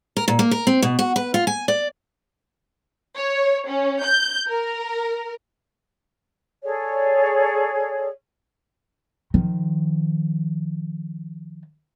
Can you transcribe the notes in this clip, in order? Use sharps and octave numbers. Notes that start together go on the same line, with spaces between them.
A#4
A#2
A#3
A#4
C4
B2
F#4
B4
F4
G#5
D5
C#5
C#4
G6
A#4
G#4 A4 C#5 D5
D#3 F3